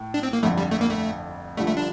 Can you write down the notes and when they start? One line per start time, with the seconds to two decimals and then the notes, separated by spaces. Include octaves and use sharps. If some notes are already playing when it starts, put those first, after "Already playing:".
Already playing: A2 A3
0.14 D4
0.23 C4
0.33 A#3
0.43 G1 F2 D3 A3
0.58 G3
0.71 A3
0.81 A#3
0.90 A3
1.57 G1 G2 D3 F3 A3
1.67 A3
1.77 D4